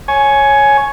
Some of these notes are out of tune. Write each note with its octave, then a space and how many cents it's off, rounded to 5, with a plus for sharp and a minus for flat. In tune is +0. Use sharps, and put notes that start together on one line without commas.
C#5 -5 G#5 +15